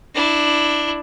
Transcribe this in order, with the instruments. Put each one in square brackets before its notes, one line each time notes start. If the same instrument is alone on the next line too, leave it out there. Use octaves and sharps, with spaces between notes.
[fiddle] D4 E4